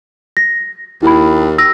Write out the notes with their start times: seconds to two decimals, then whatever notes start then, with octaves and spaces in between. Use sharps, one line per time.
0.37 A#6
1.03 D#2 E4 B5
1.58 E6 A#6